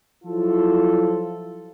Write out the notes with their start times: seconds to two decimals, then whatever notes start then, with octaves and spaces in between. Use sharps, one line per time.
0.24 F3 F#3 E4 F4 A4